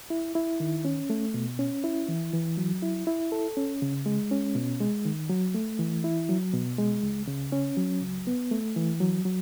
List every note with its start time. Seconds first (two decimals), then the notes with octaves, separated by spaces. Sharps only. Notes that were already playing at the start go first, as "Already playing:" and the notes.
0.10 E4
0.35 E4
0.60 D#3
0.85 C#4
1.10 A3
1.34 B2
1.59 C#4
1.84 E4
2.08 E3
2.33 E3
2.57 F#3
2.82 E4
3.07 E4
3.32 A4
3.57 C#4
3.82 C#3
4.06 G#3
4.31 C#4
4.55 B2
4.80 G#3
5.05 D#3
5.29 F#3
5.54 A3
5.79 E3
6.04 E4
6.29 F#3
6.53 B2
6.78 G#3
7.03 C#2
7.27 C#3
7.52 C#4
7.77 F#3
8.01 C#2
8.27 B3
8.51 A3
8.76 E3
9.00 F#3
9.25 F#3